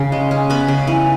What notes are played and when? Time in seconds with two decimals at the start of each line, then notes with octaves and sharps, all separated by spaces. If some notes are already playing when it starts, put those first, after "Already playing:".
Already playing: C#3
0.12 G#3
0.31 C#4
0.50 B3 B5
0.68 C#3
0.87 E3